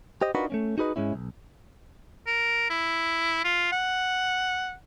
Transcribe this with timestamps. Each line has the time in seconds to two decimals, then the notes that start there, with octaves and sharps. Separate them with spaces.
0.22 G4 C5 D#5
0.35 D4 D#4 F4 F#4 A#4 B4
0.50 A3 A#3 C#4
0.78 D#4 F#4 G#4 B4 D#5
0.96 G#2 C3 G#3 C#4 E4
1.14 B1
2.27 A#4
2.70 E4
3.44 F4
3.72 F#5